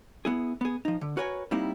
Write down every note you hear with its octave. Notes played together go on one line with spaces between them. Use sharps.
B3 E4 G#4
B3 G#4
F3 D#4
D3
F#4 A#4 B4 C#5 F#5 G#5
G3 A#3 C4 D#4 E4